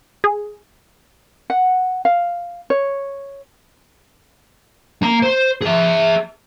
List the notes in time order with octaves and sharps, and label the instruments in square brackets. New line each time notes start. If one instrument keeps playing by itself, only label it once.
[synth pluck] G#4
[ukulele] F#5
F5
C#5
[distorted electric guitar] A#3 A#5
C5
G#4 E5